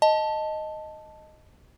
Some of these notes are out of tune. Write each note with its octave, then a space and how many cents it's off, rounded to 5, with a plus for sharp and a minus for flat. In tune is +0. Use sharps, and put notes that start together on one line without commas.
D#5 +0 A5 +0